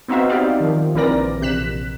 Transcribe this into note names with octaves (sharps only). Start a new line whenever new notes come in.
B3 C4 D#4 F#4 E5 F5
D#4 G4 D5 F5
D#3 F3
A#1 E3 C4 A#4 D5 A#6
A#1 C3 F#6 B6 E7